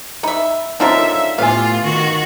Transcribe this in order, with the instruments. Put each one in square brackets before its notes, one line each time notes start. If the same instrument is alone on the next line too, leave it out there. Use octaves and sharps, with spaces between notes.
[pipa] D#4 E5 [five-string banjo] B5
[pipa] D3 F4 A#4 [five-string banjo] C4 C#4 D#4 [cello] E5
[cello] A2 F4 [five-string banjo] B3 G4 G#5 [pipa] F5
[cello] D#3 F#4